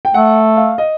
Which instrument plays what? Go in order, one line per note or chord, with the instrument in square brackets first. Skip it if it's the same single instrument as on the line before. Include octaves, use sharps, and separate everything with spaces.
[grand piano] G5
[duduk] A3 [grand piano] F#5
[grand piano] F5
D#5